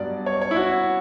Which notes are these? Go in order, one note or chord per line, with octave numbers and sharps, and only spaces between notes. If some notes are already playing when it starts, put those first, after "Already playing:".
Already playing: G2 F#3 B3 D4 D5
C#5
C#5
E4
F#4